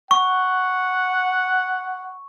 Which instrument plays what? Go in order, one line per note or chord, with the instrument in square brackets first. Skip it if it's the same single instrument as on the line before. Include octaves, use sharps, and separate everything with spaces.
[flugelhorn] F#5 [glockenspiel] C#6